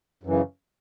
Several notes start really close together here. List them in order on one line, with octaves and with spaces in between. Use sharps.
F#2 E3 C#3